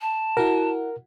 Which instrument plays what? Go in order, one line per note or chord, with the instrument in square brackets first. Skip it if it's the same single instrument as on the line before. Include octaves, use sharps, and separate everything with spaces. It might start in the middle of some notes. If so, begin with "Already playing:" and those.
[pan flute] A5
[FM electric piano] E4 F#4 F#5 [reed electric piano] A#4